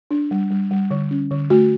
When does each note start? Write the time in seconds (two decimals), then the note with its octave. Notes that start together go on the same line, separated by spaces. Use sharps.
0.11 D4
0.31 G3
0.51 G3
0.71 G3
0.91 D3
1.11 C#4
1.31 D3
1.50 A3 F#4